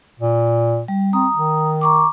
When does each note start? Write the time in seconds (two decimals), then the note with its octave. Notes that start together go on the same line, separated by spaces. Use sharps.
0.20 A#2
0.88 G3
1.13 C4 A#5 D#6
1.35 D#3
1.81 A#5 C#6 D6